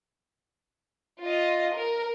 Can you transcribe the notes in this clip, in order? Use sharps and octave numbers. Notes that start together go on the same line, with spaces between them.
F4 D#5
A#4